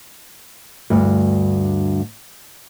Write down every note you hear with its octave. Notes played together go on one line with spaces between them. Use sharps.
D2 G2